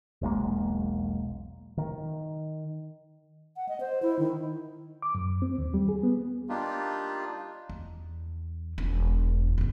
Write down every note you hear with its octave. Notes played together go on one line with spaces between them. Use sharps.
E1 B1 G#3 A#3
D#3
F#5
D#5
C5
E4
D#3
D6
F#2
C4
D#2
G3
G#4
B3
G3 A#3 D4 D#4 F4 G4
E2
E1 D4
G1 B2